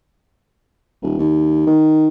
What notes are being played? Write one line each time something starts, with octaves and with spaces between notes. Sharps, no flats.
D#1
D#2
D#3